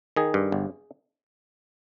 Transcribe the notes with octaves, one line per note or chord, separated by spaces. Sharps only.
D#3 G#4
G2
G1